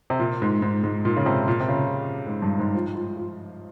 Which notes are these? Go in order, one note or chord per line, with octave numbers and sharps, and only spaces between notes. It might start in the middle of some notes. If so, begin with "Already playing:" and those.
C3
A#2
G#2
G#2
G#2
A#2
C#3
C3
A#2
C3
C#3
G#2
G2
G#2
F3
F3
F3